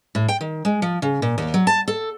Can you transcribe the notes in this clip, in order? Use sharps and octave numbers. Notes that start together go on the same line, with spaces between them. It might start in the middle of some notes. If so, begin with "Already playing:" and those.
A2
G5
D#3
G#3
F3
C#3
A#2
D#2
F#3
A5
A4